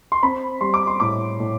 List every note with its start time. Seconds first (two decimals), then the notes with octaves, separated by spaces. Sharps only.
0.12 C6
0.23 C4 B5
0.61 G3 C6
0.74 D6
0.87 C6
1.00 A2 D6
1.40 A2